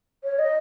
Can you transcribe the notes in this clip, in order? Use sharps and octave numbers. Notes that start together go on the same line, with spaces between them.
C#5
D#5